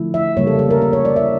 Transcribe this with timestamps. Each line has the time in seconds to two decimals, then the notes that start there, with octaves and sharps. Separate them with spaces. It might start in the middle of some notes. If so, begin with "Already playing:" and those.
Already playing: D3 F3 A3 E4
0.14 E5
0.37 C#3 G3 A#3 C#5
0.47 A4
0.59 A4
0.70 A#4
0.82 A#4
0.93 C#5
1.05 D5
1.16 E5